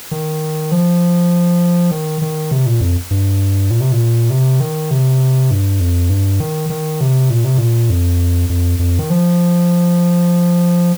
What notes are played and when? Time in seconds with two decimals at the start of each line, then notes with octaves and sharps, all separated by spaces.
0.11 D#3
0.72 F3
1.91 D#3
2.22 D#3
2.51 C3
2.66 A#2
2.81 F2
3.11 G2
3.71 A#2
3.81 C3
3.92 A#2
4.30 C3
4.60 D#3
4.91 C3
5.51 G2
5.80 F2
6.10 G2
6.40 D#3
6.70 D#3
7.01 C3
7.30 A#2
7.44 C3
7.58 A#2
7.90 F2
8.49 F2
8.79 F2
8.99 D#3
9.10 F3